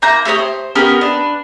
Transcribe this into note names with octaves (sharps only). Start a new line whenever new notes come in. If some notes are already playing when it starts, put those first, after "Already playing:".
A#3 E4 A#5 G6
A3 G4 C#5 D#6
C5
B3 C#4 G4 A#4
D4 B4